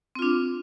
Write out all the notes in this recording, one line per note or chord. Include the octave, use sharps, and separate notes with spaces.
C4 D4 F4